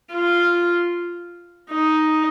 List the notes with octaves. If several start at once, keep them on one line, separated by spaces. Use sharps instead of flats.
F4
D#4